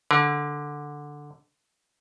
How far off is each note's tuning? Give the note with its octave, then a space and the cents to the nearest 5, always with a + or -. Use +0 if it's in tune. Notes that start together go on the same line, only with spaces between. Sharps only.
D3 +0 A#4 +40